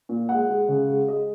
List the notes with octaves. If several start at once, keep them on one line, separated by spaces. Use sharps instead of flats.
A#2
G#3 F#5
G#3
C#3
G#3
G#3 D#5